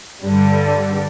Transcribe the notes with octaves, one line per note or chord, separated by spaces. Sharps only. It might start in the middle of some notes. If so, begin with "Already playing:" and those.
G2 D3 G3